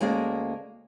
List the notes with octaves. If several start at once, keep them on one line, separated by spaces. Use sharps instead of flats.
D2 G#3 A#3 C#4 G#4 D5